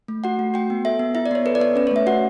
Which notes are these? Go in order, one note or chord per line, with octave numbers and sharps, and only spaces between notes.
A3
F#4 F#5
A3
F#4 G5
B3
A4 E5
B3
E4 E5
D5
B3 C#5
A4 B4
D5
B3 C#5
C#4 B4
C#5
A3 E5
F#4 F#5